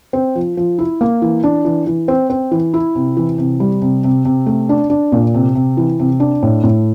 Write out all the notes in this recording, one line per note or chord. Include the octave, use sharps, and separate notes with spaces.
C4
F3
F3
E4
A#3
E3
D4
E3
E3
C4
C4
E3
E4
C3
E3
C3
G3
C3
C3
C3
A3
D4
D4
A#2
C3
C3
E3
C3
D4
A2
A2